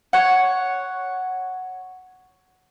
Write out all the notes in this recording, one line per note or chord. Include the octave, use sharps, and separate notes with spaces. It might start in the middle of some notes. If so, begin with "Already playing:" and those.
C#5 F#5